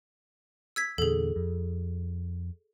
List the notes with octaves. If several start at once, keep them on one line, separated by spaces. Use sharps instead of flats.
E6 G#6 B6
E2 A#2 D3 G#4 A4
F2